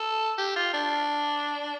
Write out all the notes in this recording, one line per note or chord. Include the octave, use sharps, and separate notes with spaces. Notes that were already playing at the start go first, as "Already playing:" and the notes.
Already playing: A4
G4
F4
D4